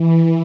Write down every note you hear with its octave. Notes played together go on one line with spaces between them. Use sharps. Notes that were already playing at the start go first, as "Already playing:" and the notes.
Already playing: E3